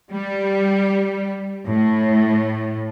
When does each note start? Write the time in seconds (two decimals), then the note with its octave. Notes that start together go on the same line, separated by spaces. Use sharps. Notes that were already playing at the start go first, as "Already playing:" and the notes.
0.11 G3
1.67 A2